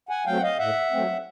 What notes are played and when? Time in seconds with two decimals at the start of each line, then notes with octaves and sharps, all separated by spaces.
0.09 F#5 G#5
0.26 F#3 A3 C4 F5 G5
0.38 F#5
0.43 D#5 F5
0.58 A2 E5 F#5
0.91 F#3 A3 C4